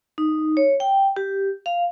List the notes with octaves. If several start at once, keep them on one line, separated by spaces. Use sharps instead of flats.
D#4
C#5
G5
G4
F5